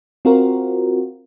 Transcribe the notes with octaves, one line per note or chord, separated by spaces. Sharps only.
C4 F4 F#4 A#4